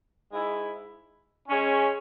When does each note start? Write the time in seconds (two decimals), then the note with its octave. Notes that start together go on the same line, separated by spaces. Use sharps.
0.33 G#2 G#3 E4
1.48 C#3 G#3 C#4